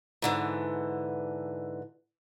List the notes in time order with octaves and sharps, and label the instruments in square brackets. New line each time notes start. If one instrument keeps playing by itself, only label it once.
[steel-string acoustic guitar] G#2 D3 E3